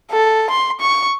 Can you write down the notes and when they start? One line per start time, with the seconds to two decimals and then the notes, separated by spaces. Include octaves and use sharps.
0.11 A4
0.50 C6
0.80 C#6